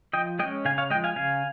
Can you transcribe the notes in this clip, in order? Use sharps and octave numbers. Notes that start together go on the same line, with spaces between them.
F3 D#5 G5
G#3 C#4 D#5 G5
C#3 F5 G#5
C#5 F5
F3 G#3 D#5 G5
F5 G#5
C#3 F5 G#5